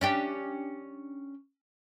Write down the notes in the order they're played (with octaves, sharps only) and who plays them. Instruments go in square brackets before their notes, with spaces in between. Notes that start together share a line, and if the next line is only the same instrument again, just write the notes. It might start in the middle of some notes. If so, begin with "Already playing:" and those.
[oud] C#4 D4 G4